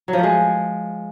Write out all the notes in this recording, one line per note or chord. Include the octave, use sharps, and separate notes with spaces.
F#3
F3
A3
G#3